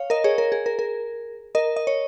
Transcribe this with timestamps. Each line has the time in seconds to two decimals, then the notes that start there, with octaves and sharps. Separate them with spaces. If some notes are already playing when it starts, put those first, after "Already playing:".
Already playing: C#5 F5
0.10 A#4 D#5
0.24 G#4 C#5
0.38 A#4
0.52 G#4
0.66 A#4
0.79 A#4
1.55 A#4 D#5
1.76 D#5
1.87 C#5